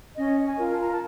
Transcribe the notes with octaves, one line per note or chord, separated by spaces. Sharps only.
C#4 D#5
G#5
F4 A#4
A5
A#5
A5